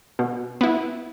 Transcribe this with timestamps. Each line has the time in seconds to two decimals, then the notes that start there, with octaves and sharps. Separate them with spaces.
0.19 B2
0.61 B3 E4